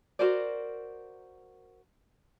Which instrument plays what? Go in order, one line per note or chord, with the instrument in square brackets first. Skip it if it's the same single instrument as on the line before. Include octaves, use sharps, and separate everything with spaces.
[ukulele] F#4 A#4 C5 D5